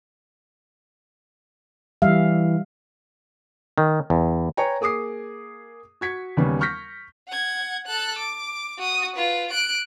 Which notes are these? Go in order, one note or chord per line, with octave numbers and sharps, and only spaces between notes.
E3 G3 E5 F5
D#3
E2
B4 C#5 G5 G#5 A#5
A#3 G#4 D6 D#6 C7
F#4 G#6 B6 C#7
D#2 C#3 G3 B3 C#4
C#6 F6 G6 A#6 B6
F#5 G#6
A4 F#6
D6
F#4 D#6
F4 B4
F#6 D7